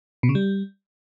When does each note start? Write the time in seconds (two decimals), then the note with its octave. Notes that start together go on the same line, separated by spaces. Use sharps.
0.23 B2
0.29 C#3
0.35 G3